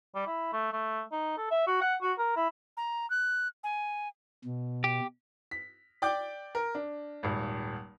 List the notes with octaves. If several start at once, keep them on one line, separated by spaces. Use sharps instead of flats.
G3
E4
A3
A3
D#4
A4
E5
F#4
F#5
F#4
A#4
E4
A#5
F#6
G#5
B2
G4
B6
D5 G5 D6 G6
A#4
D4
D#1 G#1